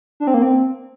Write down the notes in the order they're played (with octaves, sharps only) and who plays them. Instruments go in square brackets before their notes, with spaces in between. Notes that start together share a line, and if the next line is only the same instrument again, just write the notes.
[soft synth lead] D4
C4
A#3
C4